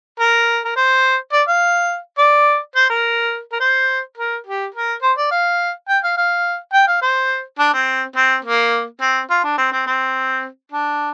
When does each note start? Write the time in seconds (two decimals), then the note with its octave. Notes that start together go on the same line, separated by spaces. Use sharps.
0.20 A#4
0.65 A#4
0.76 C5
1.32 D5
1.48 F5
2.18 D5
2.76 C5
2.90 A#4
3.52 A#4
3.60 C5
4.17 A#4
4.46 G4
4.74 A#4
5.02 C5
5.17 D5
5.31 F5
5.88 G5
6.03 F5
6.17 F5
6.73 G5
6.87 F5
7.01 C5
7.59 D4
7.73 C4
8.16 C4
8.44 A#3
9.01 C4
9.30 F4
9.44 D4
9.58 C4
9.72 C4
9.87 C4
10.72 D4